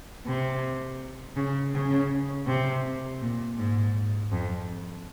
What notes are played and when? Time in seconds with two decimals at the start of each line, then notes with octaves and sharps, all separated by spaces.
0.26 C3
1.36 C#3
1.74 C#3
2.47 C3
3.22 A#2
3.58 G#2
4.32 F2